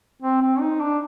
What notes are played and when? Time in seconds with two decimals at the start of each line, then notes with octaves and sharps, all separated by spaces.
0.22 C4
0.42 C4
0.61 D#4
0.80 D4